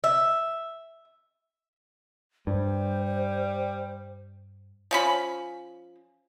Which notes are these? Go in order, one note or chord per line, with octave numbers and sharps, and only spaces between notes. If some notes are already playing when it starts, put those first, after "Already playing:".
E5
G2 G3 C5
F3 C#4 B5